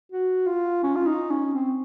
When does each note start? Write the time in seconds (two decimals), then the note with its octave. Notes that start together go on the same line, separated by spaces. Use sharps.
0.12 F#4
0.47 F4
0.83 C#4
0.96 F4
1.06 D#4
1.30 C#4
1.53 C4